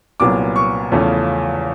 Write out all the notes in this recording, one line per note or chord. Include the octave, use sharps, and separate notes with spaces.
C2 A#2 F#3 B3 D6
C#6
E2 C#3 F3 A3 C#4